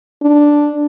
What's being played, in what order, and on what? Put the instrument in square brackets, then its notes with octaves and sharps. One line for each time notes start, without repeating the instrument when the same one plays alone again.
[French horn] D4